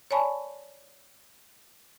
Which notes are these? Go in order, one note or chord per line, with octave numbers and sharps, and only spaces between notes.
C#5 D5 G#5 A5 B5 C#6